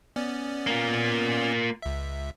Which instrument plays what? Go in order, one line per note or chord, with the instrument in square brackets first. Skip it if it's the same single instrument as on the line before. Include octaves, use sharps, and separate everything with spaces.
[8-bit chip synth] B3 C#4 D5
[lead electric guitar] A#3 F4
[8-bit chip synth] C#2 E5